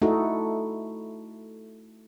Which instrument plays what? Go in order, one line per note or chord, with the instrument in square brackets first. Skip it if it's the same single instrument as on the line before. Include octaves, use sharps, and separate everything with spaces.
[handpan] A3 D#4 E4 F#4 A4